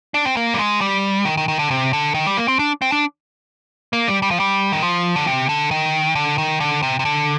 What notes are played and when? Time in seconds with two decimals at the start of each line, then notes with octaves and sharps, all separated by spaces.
0.14 D4
0.25 C4
0.37 A#3
0.54 G3
0.59 G#3
0.81 G3
1.25 D#3
1.37 D#3
1.48 D#3
1.59 D3
1.71 C3
1.93 D3
2.14 D#3
2.27 G3
2.37 A#3
2.48 C4
2.59 D4
2.82 C4
2.92 D4
3.93 A#3
4.08 G3
4.22 G3
4.31 F3
4.40 G3
4.72 D#3
4.82 F3
5.16 D3
5.27 C3
5.49 D3
5.71 D#3
6.15 D3
6.38 D#3
6.60 D3
6.83 C3
6.99 C3
7.05 D3